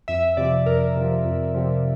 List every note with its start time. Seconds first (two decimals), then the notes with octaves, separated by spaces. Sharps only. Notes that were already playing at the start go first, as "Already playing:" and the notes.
0.08 F2 E5
0.37 C3 F3 D5
0.66 F2 A#4
0.96 C3 F3
1.25 F2
1.55 C3 F3